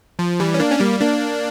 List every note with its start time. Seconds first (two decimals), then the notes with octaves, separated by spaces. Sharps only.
0.19 F3
0.40 E3 G3
0.54 C#4
0.60 A#3 D4
0.70 C#4
0.80 G3 A#3
1.01 A#3 D4